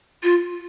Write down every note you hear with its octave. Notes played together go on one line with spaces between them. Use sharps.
F4